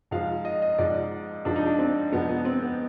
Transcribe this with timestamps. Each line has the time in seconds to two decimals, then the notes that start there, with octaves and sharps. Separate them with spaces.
0.11 G#2 F3 F5
0.45 D#5
0.62 D#5
0.78 G#2 F3 D5
1.45 G#2 F3 D4
1.56 D#4
1.66 D4
1.79 C4
2.12 G#2 F3 B3
2.29 B3
2.45 C4
2.62 B3